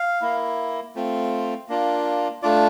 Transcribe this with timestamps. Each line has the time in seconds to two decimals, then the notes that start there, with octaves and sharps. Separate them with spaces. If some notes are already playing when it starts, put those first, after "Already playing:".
Already playing: F5
0.21 A#3 E4
0.95 A3 C4 F4
1.69 A#3 D4 F4
2.43 A3 D4 F4 D5